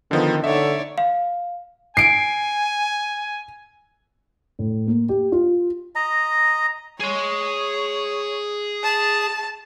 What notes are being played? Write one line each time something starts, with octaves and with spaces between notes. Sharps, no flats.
D3 D#3 F3 B3
D3 D#4 C#5 D5 E5
F5
G#5 C7 D7
A2
A#3
G4
F4
D#5 A#5
G#4 C#5 C6
A5